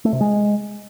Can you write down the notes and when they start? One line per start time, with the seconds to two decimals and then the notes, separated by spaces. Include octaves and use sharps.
0.05 A3
0.13 C3
0.21 G#3